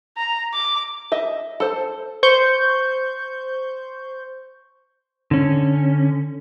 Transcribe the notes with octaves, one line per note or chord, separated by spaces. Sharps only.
A#5
D6
D#5 E5
A4 C5
C5 C#6 G6
D3 C#4